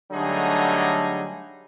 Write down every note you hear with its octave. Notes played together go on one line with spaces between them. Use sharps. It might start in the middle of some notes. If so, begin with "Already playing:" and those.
D3 F#3 G3 A3 D#4 G#4